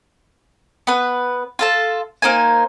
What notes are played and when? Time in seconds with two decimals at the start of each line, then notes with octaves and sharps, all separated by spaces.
0.87 B3 B4
1.59 F4 A4 A5
2.22 A#3 D#4 C5 G#5